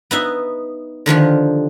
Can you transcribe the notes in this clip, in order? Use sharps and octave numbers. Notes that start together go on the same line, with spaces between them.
B3 D#4 E5
D3 D#3 F3 G4